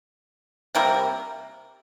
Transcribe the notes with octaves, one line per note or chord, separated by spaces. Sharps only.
C3 G3 A#3 A#4